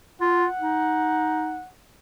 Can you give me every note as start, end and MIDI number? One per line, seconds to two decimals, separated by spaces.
0.21 0.46 65
0.21 1.69 78
0.60 1.59 63